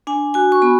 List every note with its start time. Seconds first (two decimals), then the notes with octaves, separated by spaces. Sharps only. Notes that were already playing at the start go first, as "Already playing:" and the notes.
0.07 D4 G#5
0.34 F#4 G#5
0.52 C#6
0.62 B3 B5